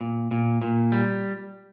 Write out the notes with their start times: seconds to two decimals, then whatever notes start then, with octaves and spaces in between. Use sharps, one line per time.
0.01 A#2
0.31 A#2
0.62 A#2
0.92 G3